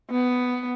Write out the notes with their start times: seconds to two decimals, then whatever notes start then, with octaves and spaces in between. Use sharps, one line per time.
0.10 B3